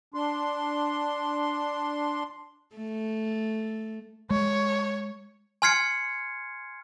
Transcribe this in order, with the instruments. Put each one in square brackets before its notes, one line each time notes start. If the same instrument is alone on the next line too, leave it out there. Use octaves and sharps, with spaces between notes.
[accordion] D4 C6
[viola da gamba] A3
[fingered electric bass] G#3 [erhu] C#5
[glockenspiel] G#5 C6 F6 G#6 C7 C#7